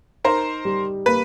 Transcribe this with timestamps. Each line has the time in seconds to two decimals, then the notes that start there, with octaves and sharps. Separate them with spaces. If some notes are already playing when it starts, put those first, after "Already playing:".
0.24 D#4 A#4 C5
0.65 G3
1.06 A#3 B4